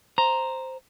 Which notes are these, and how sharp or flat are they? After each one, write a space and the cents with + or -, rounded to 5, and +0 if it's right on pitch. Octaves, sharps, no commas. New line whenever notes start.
C5 +0 A#5 +0